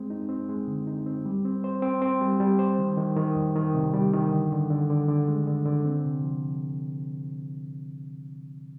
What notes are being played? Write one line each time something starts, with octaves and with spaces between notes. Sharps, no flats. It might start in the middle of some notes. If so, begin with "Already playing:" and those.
Already playing: G#3 C4
D#4
C4
G#3
D3
D#4
C4
G3
C4
C5
C4
C4
G3
G3
C5
D#3
D#3
D#3
F2
D#3
C3
G3
D#3
D3
D3
D3
D3
D3
G#3
D3
D3
C4
C3
F3